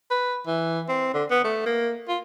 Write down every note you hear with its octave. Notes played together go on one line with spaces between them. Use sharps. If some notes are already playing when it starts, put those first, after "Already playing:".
B4
E3
C4
D3
B3
A3
A#3
F4